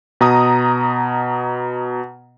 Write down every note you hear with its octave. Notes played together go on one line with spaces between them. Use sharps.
B2 A#5 D#6